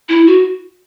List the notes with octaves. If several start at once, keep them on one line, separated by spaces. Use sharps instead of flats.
E4
F#4